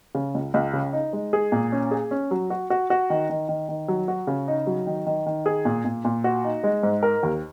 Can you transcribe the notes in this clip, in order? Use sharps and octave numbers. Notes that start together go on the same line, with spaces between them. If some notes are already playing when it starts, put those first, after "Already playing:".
C#3
C#2
C#2
C#3
D#4
G#3
G#4
A#2
C#4
G#4
C#4
F#3
F#4
F#4
F#4
D#3
D#3
D#3
D#3
F#3
F#4
C#3
D#4
F#3
D#3
D#3
D#3
G#4
A#2
A#2
A#2
F#4
D#4
G#3
G#2
A#4
D#2